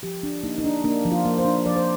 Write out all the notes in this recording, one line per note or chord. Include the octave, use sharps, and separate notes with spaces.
F3 G4
D4
A#3 D#4
D#4
D4
A#3 D4
F3
F4
A#3
C5
D4
F3 D5
C5